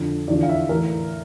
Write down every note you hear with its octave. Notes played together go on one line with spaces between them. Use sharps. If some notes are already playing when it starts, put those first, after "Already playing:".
Already playing: F2 D3 F3
E2 D3 F3 D5
F5
E5
A2 E3 A#4